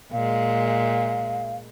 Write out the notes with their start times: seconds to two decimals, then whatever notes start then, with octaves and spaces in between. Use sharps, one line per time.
0.12 A#2 G#3 F5